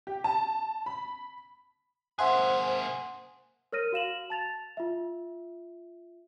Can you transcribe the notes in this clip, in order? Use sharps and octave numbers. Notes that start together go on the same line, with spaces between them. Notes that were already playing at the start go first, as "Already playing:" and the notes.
G4
A5
B5
A#3 G#4 C5 E5 F#5 G#5 C6 F#6
A#4 C#5 F6 A#6 D#7
F#4 F5 E7 F#7
A5 A6 F7
F4 E5